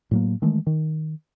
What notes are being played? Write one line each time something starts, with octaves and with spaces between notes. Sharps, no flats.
A2 F#3 A#3
D#3 E3 G#3 A3
D#3